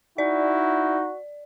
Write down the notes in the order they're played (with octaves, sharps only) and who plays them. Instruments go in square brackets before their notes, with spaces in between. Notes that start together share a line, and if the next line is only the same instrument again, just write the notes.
[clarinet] D#4 [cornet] E4 [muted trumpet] F#4 [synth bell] D5